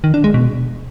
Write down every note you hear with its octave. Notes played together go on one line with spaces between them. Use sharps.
D#3
D4
G#3
B2